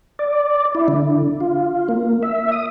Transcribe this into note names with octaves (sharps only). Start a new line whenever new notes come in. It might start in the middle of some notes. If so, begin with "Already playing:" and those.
D5
E4
D3
F4
A#3
E5
D#6